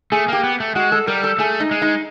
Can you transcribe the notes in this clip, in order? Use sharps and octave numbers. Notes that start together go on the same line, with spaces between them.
A3 G#4
A#3 G4
B3
A3
G#3 F#4
A4
G3 A#4
A4
A3 G#4
D#4
G#3
D#4